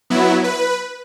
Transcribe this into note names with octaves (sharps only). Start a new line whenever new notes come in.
F#3 B3 E4
B4